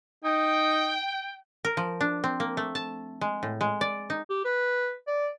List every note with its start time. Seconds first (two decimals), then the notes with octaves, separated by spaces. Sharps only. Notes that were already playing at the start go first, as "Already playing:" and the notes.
0.24 D#4 G5
1.65 A#4
1.77 F3
2.01 D4
2.24 C4
2.40 A#3
2.57 A3
2.75 A5
3.21 G#3
3.43 A2
3.61 G#3
3.81 D5
4.10 D#4
4.30 G4
4.45 B4
5.07 D5